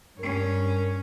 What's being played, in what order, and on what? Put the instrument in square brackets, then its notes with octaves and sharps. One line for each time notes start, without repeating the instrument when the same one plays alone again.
[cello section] G2 [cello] C#4 C#5 [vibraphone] A#4